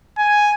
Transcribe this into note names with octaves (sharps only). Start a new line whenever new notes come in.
G#5